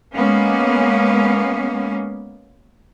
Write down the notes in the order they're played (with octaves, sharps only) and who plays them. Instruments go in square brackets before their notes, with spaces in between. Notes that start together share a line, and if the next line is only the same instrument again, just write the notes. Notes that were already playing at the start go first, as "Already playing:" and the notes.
[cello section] G#3 A#3 B3 C#4